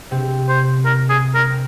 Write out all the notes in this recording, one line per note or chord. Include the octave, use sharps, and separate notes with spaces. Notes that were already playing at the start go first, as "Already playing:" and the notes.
C3 C4
C5
A#4
G#4
A#4
C4